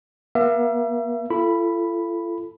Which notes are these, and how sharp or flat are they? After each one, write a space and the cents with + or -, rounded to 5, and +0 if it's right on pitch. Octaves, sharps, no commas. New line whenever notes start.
A#3 +40 E5 +35
F4 -45 A4 +0 B5 +0